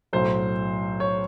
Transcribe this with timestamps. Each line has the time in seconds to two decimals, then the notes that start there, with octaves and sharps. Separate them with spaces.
0.13 B1 A2 F#3 C5
1.00 C#5